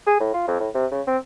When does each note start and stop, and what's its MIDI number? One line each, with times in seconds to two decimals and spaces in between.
0.07 0.15 68
0.20 0.32 45
0.33 0.47 65
0.47 0.56 41
0.60 0.69 45
0.74 0.86 48
0.91 1.02 49
1.07 1.17 60